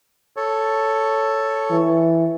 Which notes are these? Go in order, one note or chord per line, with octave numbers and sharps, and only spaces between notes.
A4 C#5
E3